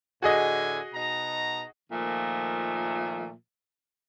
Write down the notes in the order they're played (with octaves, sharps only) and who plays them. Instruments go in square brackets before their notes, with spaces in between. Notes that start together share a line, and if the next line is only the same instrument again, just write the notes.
[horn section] A2 D3 G#5 [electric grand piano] F#4 G#4 D#5
[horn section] B2 D#4 A#5
[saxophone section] A#2 D#3 F3 A3